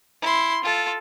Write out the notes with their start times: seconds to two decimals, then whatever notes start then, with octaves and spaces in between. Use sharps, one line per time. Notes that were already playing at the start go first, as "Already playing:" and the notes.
0.22 E4 C6
0.64 F4 A4